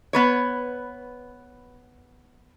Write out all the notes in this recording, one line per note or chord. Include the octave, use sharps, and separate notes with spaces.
B3 B4 C#5